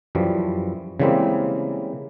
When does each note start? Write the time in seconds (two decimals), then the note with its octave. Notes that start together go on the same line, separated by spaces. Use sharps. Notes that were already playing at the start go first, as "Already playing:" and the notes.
0.15 F#2 E3 F3 G3
1.00 C#3 E3 G3 G#3 A#3 C4